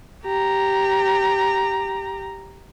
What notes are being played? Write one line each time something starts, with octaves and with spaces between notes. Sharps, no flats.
G4 A#5